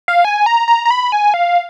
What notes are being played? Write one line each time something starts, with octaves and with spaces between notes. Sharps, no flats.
F5
G#5
A#5
A#5
A#5
B5
G#5
F5